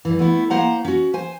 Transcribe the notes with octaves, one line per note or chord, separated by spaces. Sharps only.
G2 E3
A3 B3 E4
A#3 C5 F#5 A#5
C#4 F#4
C5 G#5